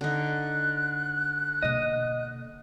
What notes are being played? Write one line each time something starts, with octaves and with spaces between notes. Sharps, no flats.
D3 D#4 F#6
B2 A#3 D#5